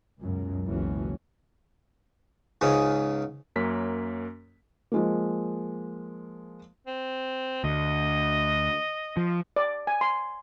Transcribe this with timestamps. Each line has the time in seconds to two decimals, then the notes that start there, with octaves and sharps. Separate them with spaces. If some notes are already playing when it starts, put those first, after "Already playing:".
0.20 C#2 F#2 B2
0.65 F#1 C#2 B2 E3 F#3 C#4
2.61 C#2 G#2 C#3 D#6
3.56 F#2 A#3 C#4 B6
4.92 F3 G#3 A#3
6.87 C4
7.64 D2 D#5
9.17 F3
9.56 D5
9.87 G#5
10.01 C6